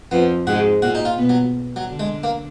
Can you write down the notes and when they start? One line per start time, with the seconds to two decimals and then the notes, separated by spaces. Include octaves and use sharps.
0.11 F2 F3 B3
0.47 G#2 G#3 F#4
0.82 A#2 A#3 F#4
0.95 D#4
1.05 F4
1.17 B2 B3
1.29 F#3
1.76 F#3
1.88 D3 D4
1.99 G#3
2.23 A#3